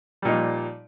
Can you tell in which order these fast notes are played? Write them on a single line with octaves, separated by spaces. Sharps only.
G3 A#2 D#4 F3